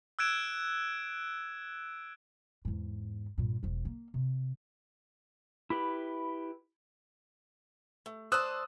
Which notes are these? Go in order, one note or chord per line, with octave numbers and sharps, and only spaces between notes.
E6 F#6 G#6 D7 E7
E2 G#2
G2 A#2
E1 F3
A#3
C3
E4 G4 B4 B5
A3
C5 D5 A5 D#6 E6 F#6